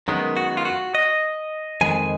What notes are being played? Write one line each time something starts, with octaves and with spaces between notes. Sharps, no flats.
F#2 D#3 G#3 B3
F#4
F4
F#4
D#5
F2 D#3 G#3 G#5